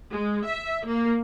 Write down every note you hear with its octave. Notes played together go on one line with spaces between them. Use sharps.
G#3
E5
A#3